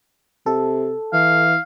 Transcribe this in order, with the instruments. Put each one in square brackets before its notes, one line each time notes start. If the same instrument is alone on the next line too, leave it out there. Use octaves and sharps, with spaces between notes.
[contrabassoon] C3 [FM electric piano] A4
[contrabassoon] E3 [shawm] F5